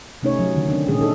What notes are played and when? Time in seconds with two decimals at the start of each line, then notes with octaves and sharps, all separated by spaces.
0.23 C3 A3 C#4 D#4 C#5
0.39 F#3
0.55 D3 D#3
0.68 C4 D4
0.88 A#2 D#3 G#3 C#4 G#4
1.01 D4 D#4 A4